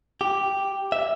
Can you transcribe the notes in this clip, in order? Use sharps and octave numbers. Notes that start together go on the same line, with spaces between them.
G4
E5